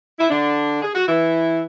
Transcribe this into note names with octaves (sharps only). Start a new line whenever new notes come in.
E4
D3 D4
G#4
F#4
E3 E4